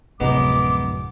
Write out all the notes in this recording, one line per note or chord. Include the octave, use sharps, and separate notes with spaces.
D1 F#2 C3 F3 G#3 B3 D#4 D6